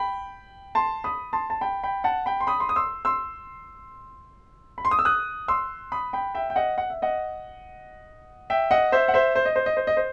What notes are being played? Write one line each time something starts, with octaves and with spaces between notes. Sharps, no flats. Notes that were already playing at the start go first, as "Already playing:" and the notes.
Already playing: G5 B5
A5 C6
B5 D#6
A5 C6
A5
G5 B5
G5 B5
F#5 A5
G5 B5
C6
B5 D#6
C6
D#6
C6 E6
C6 E6
B5
C6
D#6
E6
D#6 F#6
C6 E6
B5 D#6
G5 B5
E5 G5
G5
D#5 F#5
F#5
E5
D#5 F#5
E5 G5
D#5 F#5
C5 E5
F#5
C5 E5
C5
D#5
C5
D#5
C5
D#5
C5